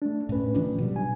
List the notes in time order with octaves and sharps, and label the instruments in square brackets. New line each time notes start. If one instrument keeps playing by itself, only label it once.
[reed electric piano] A3 D4
[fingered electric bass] A2 [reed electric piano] A3 C#4 B4
[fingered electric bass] D#3 F3 D4
B2 F#3 G3
[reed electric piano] G#5